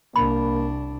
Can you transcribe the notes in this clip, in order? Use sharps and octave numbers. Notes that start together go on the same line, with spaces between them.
C2 A#3 D4 B5